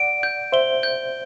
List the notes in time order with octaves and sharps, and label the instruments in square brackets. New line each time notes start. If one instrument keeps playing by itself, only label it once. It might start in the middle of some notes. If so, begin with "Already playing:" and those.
Already playing: [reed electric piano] D5 F#5 [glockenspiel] D7
[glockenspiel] G6
[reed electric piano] C5 E5 [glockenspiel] G7
[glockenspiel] G6